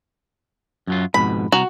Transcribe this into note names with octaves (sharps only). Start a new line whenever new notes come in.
F#2 F#3 F4
F2 G#2 B2 B5
C2 F#4 A#5